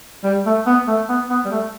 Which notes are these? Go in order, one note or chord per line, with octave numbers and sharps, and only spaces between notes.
G3
A3
B3
A3
B3
B3
G3
A3